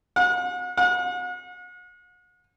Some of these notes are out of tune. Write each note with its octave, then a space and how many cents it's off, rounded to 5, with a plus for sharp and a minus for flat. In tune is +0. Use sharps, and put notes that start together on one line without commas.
F#5 -40
F#5 -40